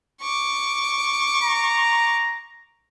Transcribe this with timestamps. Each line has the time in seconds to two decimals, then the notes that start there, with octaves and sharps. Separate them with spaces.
0.21 C#6 D6
1.43 A#5